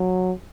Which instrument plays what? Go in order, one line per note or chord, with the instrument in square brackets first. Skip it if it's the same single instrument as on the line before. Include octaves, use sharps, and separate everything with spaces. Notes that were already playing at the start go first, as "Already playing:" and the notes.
Already playing: [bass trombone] F#3